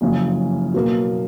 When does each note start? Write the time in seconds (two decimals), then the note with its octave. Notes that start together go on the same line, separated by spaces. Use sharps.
0.01 F#1 F2 C#3 F#3 C#4
0.74 B2 F#3 A#3